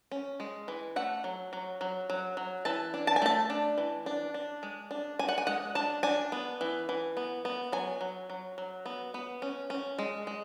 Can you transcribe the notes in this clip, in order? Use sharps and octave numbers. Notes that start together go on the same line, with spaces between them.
C#4
G#3
E3
A3 F#5
F#3
F#3
F#3
F#3
F#3
E3 A5
D4
A5
G#5
A3 A5
D4
E3
D4
D4
G#3
D4
D4 G#5
F#5
G#5
G#3 F#5
D4 A5
D4 G#5
B3
E3
E3
B3
B3
F#3 G#5
F#3
F#3
F#3
B3
B3
C#4
C#4
G#3
G#3